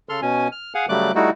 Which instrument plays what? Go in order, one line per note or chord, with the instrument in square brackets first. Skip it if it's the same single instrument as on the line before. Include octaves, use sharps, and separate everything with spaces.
[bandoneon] C#3 A4 C6 F6
B2 C#4 G#5
F6
G#4 F5 F#5 G#5
C#3 F#3 G3 A3 D6 F#6
G3 A3 D#4 E4 F#4